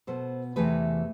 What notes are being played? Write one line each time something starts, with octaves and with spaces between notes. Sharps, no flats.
B2 B3 A4 C5
E2 C3 E3 A3 G#4 B4